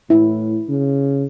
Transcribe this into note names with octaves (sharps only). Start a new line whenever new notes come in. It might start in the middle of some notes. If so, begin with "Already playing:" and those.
A2 E4
C#3